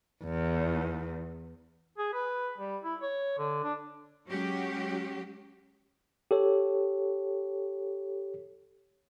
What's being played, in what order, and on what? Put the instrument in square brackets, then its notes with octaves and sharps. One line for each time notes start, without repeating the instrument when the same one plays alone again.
[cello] E2
[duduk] G#4
B4
G3
E4
C#5
D3
D4
[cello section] F#3 G#3 C#4 F#4 G4
[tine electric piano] G4 A4 C#5